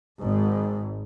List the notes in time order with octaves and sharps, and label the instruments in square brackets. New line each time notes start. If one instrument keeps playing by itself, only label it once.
[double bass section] G#1 G#2